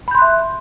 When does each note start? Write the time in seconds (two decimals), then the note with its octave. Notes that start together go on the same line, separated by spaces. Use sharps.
0.08 B5
0.11 G6
0.15 C6
0.18 F#6
0.22 E5